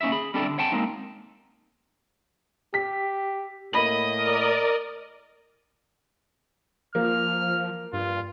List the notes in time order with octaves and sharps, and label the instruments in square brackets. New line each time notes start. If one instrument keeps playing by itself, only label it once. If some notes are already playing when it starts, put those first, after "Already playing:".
[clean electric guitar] A#3 C#4 D#4 E4 E5
G#4 B5
G3 C4 D4 E4 A4 D5
D3
C#5 F#5 G5 A5
G#3 A#3 C4 D#4
[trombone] G4 [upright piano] B6
[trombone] A2 [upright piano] A#3 B5 F#7 [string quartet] D#5 D#6
[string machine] A#4 D5
[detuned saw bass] F3 [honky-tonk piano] A#3 [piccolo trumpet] F6
[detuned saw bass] G2 [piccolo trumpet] F4